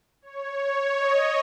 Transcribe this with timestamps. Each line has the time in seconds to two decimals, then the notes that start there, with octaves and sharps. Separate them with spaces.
0.22 C#5
0.97 D#5